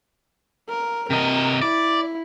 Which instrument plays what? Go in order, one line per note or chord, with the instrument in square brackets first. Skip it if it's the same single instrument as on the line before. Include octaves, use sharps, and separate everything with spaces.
[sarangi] A#4
[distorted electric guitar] C3 D#5 [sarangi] A#4
[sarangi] E4 [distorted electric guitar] D5